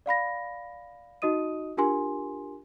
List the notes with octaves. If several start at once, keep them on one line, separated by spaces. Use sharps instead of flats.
D5 F5 B5 A#6
D#4 F#4 D#5 D#6 D#7
D4 F4 G4 A#4 G#5 C6